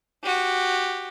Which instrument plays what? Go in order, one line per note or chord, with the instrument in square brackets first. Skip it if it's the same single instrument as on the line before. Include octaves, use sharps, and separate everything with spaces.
[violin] F#4 G4